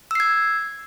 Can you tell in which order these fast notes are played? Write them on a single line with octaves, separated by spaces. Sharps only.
E6 C7 G#6